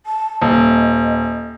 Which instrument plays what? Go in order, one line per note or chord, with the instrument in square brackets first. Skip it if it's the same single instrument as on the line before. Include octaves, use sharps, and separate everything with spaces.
[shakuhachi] A5
[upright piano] D#1 [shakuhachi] D#5